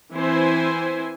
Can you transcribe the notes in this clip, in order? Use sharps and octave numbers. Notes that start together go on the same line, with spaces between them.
E3 C4 E4 C5 G#5